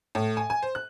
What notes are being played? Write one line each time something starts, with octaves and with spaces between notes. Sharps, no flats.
A2
G#5
G#5
C5
F#6